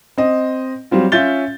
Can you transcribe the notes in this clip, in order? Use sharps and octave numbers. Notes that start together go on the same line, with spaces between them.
C4 D#5
F#3 G3 C4 F4
C#4 F4 E5 G6 A6 G7